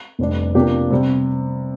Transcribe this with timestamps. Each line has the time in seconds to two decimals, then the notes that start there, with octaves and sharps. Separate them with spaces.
0.19 F1 F2 C3 G3 D4
0.55 C3 F3 A#3 D4 G4
0.91 C3 G3 C4